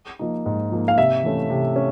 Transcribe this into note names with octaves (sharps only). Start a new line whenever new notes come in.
F3 A#3 D#4
G#2
F3 A#3 D#4
F5
C3 E5
E3 A3 C#4
C3
C#4